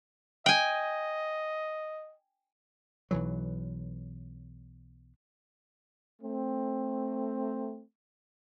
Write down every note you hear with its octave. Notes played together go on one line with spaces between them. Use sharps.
D#5 G5 G#5
B1 E3 F#3
A3 C4